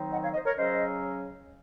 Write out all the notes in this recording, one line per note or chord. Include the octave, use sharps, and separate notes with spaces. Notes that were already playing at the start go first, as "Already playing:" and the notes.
Already playing: D#3 F#3 C4 D#4
D#5 F#5
C#5 F5
C5 D#5
A#4 C#5
C#3 F#3 C#4 C5 D#5